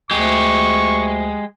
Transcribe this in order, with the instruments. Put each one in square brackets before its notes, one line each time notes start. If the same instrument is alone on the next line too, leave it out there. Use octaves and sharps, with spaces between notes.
[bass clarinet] D2 [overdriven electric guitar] G#3 G4 [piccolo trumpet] C#6